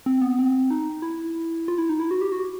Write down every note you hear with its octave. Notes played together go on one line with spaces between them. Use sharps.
C4
B3
C4
D#4
E4
F4
E4
D#4
E4
F#4
G4
F#4